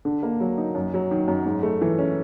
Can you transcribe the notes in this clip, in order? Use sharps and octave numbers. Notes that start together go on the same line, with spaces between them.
D3
A#3
F#3
D#4
F#2
F#3
D#3
F#2
G#2
A3
E3
C#4